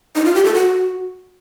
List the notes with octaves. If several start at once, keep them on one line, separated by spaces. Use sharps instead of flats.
D#4
F4
G4
A4
F#4